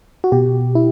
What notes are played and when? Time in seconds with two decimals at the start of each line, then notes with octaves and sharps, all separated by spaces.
0.24 F#4
0.32 B2 G4
0.75 E4